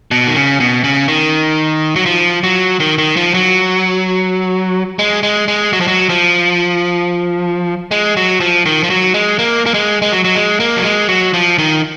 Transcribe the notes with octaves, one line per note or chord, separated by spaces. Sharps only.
B2
D#3
C#3
B2
C#3
D#3
F#3
F3
F#3
D#3
D#3
F3
F#3
G#3
G#3
G#3
F#3
F3
F#3
F3
G#3
F#3
F3
D#3
F3
F#3
G#3
A#3
A#3
G#3
G#3
F#3
F#3
G#3
A#3
F#3
G#3
F#3
F3
D#3